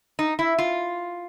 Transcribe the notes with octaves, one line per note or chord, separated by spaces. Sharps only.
D#4
E4
F4